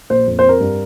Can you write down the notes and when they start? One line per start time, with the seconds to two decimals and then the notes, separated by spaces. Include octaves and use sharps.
0.10 A#1 C5
0.27 F2
0.39 C4 C5
0.49 A#4
0.60 G2